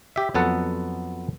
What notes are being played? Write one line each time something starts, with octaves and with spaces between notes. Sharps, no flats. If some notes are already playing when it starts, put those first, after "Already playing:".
G4 E5
F2 F#3 B3 A4 F#5